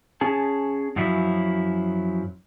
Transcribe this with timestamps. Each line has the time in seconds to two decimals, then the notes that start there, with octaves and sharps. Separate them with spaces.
0.21 C#4 G#4 A5
0.96 F#2 F3 F#3 E4